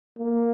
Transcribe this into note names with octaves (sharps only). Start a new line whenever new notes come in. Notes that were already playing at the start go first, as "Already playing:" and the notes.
A#3